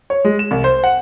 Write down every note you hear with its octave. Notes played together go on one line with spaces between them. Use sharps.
C#5
G#3
E7
C2
C5
F#5